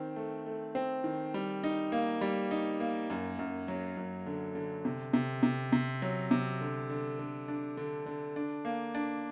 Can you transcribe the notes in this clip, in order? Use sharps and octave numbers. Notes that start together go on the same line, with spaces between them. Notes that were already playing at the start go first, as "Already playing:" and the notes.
Already playing: D#3 C4
A3
A3
C4
D#3
G3
D#4
A#3
G3
D#4
A#3
F#2
F#2
F#3
F#2
D3
D3
C3
C3
C3
C3
F#3
C3
D3
D3
D3
D4
D3
D3
D4
A#3
D4